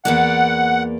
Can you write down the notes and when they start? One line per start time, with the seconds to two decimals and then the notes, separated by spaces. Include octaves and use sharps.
0.05 E2 A#3 D5 F#5